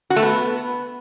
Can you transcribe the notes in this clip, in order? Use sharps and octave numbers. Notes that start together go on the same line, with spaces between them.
F#4
A3
B3